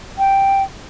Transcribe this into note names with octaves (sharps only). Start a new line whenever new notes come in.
G5